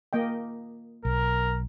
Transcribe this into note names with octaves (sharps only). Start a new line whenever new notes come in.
A#3 D#5 G5
B1 A#4